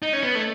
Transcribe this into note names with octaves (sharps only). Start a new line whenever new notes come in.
D#4
C#4
B3
A3